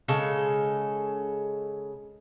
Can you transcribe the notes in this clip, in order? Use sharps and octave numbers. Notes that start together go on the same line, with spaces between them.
C#3 G#3 A4